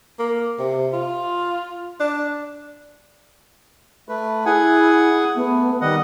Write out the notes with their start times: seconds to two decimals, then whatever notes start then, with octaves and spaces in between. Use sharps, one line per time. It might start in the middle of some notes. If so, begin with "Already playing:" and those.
0.19 A#3
0.59 C3
0.93 F4
2.00 D4
4.09 A3 B4
4.46 E4 G#4 F#5 G#5
5.35 A3 B3
5.81 D#3 G3 D#5 F#5